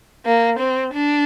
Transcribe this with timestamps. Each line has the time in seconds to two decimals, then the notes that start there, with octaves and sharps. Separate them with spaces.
0.25 A#3
0.59 C4
0.93 D4